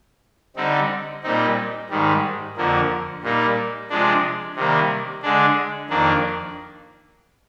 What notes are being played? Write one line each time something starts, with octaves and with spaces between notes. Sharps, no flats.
D3 G3 C4 D#4
A#2 G3 C4 D#4
G#2 D#3 G3
F2 D3 F3 A#3
A#2 G3 A#3 D#4
C3 F3 G#3 D4
C3 D#3 G3 A#3
D3 G#3 D4
F2 D#3 A#3 D4